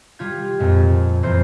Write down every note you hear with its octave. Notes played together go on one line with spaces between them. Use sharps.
G3 F4 G#6
F2 A#2 G#3
F2 E3 A#3 C5